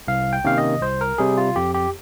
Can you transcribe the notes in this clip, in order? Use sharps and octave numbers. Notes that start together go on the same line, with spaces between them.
C2 F5
G5
C3 D#3 A#3 C#4 F5
D#5
C2 C5
A#4
C3 G3 G#4
F4
F2 G4
G4